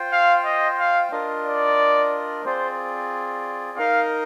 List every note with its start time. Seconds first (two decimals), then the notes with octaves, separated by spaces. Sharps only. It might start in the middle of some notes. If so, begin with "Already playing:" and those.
Already playing: F4 C5 G5
0.12 F5
0.45 D#5
0.79 F5
1.12 D4 F4 A#4 D#5
1.45 D5
2.45 C4 F4 G#4 C5 D5
3.78 D#4 A#4 D#5 F5